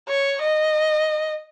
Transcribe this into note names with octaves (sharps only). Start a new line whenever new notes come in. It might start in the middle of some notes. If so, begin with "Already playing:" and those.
C#5
D#5